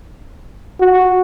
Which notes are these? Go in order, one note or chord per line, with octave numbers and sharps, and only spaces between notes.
F#4